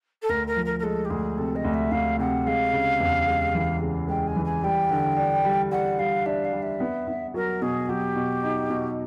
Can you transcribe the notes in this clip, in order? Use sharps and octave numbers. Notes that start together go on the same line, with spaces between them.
A4
D2 A#4
A#4
F3
A#4
A#4
G#3 A4
G4
D2 G#4
C3 A4
D#5
D2
E5
D2 F5
C3 F#5
G#3 F5
C#3
E2
G#3
E3
C#3
G#3 G5
G#5
E3
G#5
G3 G5
D3
D4
G3
G3 F#5
G3 F5
D4 E5
F5
G3
E5
B3
B3
F#3 A#4
B2 G#4
F#3 G4
B2
D#4
B2